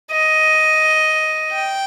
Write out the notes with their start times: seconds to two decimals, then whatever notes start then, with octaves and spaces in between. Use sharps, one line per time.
0.12 D#5
1.53 G5